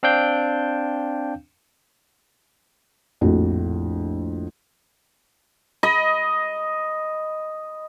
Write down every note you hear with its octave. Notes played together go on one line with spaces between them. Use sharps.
C4 D4 F5 G5 G6
A#1 F2 A2 F#4
D#5 B5